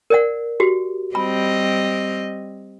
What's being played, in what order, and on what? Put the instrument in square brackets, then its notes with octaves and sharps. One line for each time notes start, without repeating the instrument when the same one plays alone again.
[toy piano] A#4 D5 F#5
F#4 G4
[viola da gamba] G3 C4 D#5 [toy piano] B5